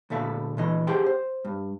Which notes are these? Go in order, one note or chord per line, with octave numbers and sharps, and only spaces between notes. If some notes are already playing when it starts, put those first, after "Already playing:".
D2 A#2 A4 E5 F5
A#2 E3 D#5
G4 G#4 C5 F#5 G5
C5
G2